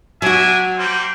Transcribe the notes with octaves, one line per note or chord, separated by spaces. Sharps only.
F#3 D4 F#4 E5 G#5
G3 A#3 C5